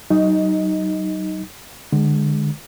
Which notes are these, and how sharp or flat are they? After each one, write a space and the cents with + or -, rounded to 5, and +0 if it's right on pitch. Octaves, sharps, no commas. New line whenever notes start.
F#3 +40 D#4 +0 D#5 +15
D3 +25 G#3 +0